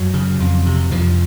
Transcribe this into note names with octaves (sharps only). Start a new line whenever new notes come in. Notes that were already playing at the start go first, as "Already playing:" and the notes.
Already playing: F#2 F#3
C#3
F2
C3
F2 F3